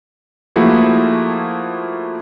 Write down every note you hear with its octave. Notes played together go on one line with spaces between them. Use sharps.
F3 A3 A#3 E4 F#4 G#4